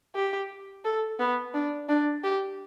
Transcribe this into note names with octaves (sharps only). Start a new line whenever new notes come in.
G4
A4
B3
D4
D4
G4